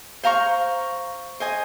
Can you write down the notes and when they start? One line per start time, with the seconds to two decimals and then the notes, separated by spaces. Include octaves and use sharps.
0.23 C5 F5 A#5 C#6
1.40 C5 D#5 G#5